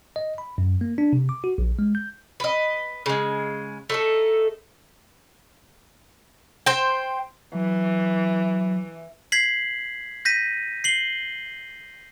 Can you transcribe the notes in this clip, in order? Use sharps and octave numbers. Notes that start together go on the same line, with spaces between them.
D#5
B5
F#2
A#3
D4
C3
D6
F#4
A#1
G#3
G6
B4 D#5
C#3 G#3
A3 D#4 A4
C5 G5
E3 F#3
G#6 B6 C7 F#7
G6 A#6 B6 D#7
C7 F#7 G7